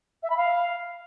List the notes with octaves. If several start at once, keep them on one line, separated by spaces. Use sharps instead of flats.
E5
B5
F5